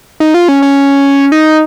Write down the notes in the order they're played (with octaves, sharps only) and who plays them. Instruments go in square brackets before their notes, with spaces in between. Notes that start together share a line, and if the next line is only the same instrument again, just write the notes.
[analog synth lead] D#4
F4
C#4
C#4
D#4